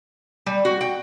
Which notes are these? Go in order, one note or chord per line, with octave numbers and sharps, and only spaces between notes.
G3
F#4
G5